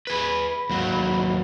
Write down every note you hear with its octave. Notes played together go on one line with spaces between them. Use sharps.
G#4 B4 B5
D#2 F#3